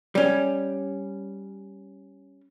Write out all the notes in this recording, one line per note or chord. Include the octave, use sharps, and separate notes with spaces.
G3 C#4